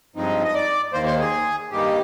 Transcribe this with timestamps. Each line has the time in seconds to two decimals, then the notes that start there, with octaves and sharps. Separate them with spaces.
0.16 G2 F3 G#3 C4 D#4
0.44 D#5
0.54 D5
0.93 D#2 D#3 A#3 C5
1.06 C5
1.20 G#4
1.71 G2 D#3 G3 A#3 D#4 G4